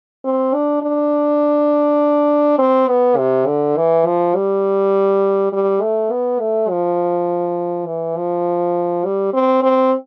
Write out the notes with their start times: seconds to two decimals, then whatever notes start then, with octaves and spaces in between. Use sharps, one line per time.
0.24 C4
0.54 D4
0.82 D4
2.59 C4
2.88 B3
3.17 C3
3.46 D3
3.77 E3
4.06 F3
4.35 G3
5.53 G3
5.82 A3
6.11 B3
6.40 A3
6.70 F3
7.87 E3
8.17 F3
9.05 G3
9.33 C4
9.63 C4